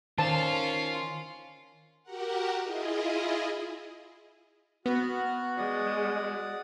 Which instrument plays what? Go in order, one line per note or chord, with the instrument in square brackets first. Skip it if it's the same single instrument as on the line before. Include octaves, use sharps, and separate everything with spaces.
[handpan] D#3 C5 [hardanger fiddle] C#4 F5 [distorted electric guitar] F4 [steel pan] A5
[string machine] F#4 G4 A#4 F#5
E4 F4 G#4 D#5
[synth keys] B3 [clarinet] F#4 [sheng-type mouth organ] F#5 F6 F#6
[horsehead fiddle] G#3 [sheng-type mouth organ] D5 F#5 D#6